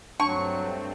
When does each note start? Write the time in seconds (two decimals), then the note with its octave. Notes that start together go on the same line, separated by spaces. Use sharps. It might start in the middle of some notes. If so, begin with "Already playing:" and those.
0.20 G2 F#3 A3 C4 D4 A5 C6 C#6